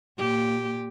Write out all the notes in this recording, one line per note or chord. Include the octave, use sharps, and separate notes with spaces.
A#2 G4